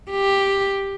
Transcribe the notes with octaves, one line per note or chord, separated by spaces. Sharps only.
G4